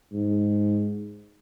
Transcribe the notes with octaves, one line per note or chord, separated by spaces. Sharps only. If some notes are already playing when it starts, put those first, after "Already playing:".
G#2